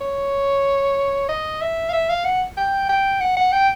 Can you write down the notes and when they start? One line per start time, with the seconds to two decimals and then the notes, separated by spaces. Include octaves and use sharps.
0.01 C#5
1.29 D#5
1.61 E5
1.89 F5
1.93 E5
2.09 F5
2.25 F#5
2.57 G5
2.89 G5
3.20 F#5
3.37 F#5
3.52 G5